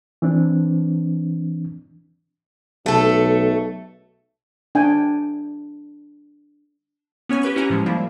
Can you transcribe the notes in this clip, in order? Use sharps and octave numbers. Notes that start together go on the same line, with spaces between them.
E3 C4 D4
B1 A3 A4
D4 G5 G#5
B3 C#4 C#5 G#5
G4 B4 B5 C#6
C#4 E4 G4 F#5 G#5 A#5
A2 F3 G#3
F3 G3 A#3 E4